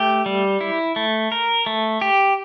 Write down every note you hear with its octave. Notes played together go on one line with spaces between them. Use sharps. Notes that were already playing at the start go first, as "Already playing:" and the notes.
Already playing: A3 G4
G3
E4
A3
A#4
A3
G4